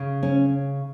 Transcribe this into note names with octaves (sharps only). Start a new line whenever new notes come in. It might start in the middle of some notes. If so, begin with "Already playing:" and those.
Already playing: C#3
C#4